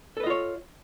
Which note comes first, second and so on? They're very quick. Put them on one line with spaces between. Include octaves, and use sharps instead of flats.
A4 B4 D#5 F4 C#5